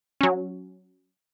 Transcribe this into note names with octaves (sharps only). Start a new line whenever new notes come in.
F#3 C#4